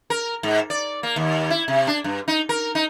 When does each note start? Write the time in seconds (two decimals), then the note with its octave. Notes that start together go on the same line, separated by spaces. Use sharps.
0.10 A#4
0.43 G#2
0.70 D5
1.03 A#3
1.16 D#2
1.50 E4
1.68 C3
1.87 D4
2.04 G2
2.28 D#4
2.49 A#4
2.75 D#4